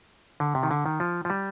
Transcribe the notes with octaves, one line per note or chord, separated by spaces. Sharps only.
D3
C3
D#3
D3
D#3
F3
F3
G3